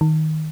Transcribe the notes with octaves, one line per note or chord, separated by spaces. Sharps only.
D#3